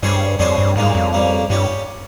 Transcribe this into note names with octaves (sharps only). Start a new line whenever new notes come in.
G2 G3 C#4 G#4 C5
F2 G3 C#4 G#4 C5
G2
G#2 C#3 G3 A#3
F2
C#3 G3 A#3
G2 G3 C#4 G4